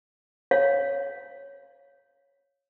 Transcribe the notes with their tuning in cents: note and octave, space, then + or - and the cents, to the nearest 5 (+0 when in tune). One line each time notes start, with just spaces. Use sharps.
C#5 +0 F5 +0